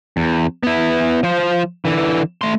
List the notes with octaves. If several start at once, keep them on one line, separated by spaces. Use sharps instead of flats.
E2
B3 E4
F3 C5
D3 E3
A3 C6